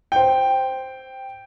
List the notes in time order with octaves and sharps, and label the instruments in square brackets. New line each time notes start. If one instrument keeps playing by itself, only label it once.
[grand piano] C5 G5